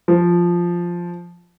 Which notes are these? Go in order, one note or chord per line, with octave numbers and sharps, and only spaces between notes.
F3